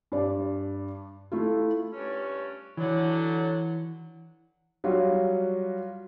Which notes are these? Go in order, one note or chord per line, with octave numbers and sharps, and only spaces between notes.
G2 D5
A3 E4 F4
G2 C#4
D3 E3 F#3
F#3 G3 F4 F#4